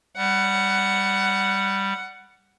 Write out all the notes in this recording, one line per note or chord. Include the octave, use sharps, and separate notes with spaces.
G3 F#5